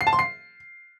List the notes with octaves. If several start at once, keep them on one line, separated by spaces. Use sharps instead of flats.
C7
A5
C6
C7